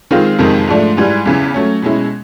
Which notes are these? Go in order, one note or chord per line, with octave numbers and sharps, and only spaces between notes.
D#3 G#3 C4 F4
F2 C3 D#3 G#3
G#2 F3 A3 D4
G#2 E3 G3
E2 C#3 E3
F#3 A3 C#4
B2 G#3 C#4 E4